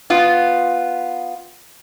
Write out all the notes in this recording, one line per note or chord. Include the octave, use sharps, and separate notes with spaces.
B3 F4